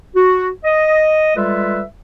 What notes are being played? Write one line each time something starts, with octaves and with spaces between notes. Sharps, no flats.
F#4
D#5
G3 G#3 F4 A4 B4 E5